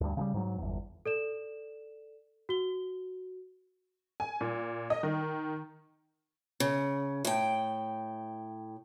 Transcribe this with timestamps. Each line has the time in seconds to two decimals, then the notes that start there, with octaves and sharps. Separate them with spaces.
0.01 D2 G2
0.17 C#3 F3 G3
0.34 G#2 F#3
0.58 G1 E2
1.06 A4 D5 E7
2.49 F#4 G7
4.20 G#5
4.41 A#2
4.90 D#5
5.03 D#3
6.60 C#3
7.25 A2 G5